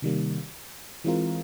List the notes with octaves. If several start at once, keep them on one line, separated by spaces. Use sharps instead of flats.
C3 D#3 G3 A#3
E3 G#3 C4 F4 A#4